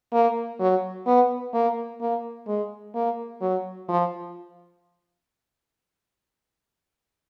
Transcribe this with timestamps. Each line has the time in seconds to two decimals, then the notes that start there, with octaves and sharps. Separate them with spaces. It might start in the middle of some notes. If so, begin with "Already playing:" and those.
0.13 A#3
0.60 F#3
1.07 B3
1.54 A#3
2.01 A#3
2.47 G#3
2.95 A#3
3.41 F#3
3.89 F3